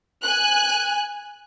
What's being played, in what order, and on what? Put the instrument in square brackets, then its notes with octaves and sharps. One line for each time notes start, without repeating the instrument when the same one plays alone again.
[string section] G#5 F#6